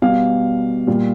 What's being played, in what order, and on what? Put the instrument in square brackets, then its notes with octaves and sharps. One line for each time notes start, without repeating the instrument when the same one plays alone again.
[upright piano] B2 G3 F5
A#2 G3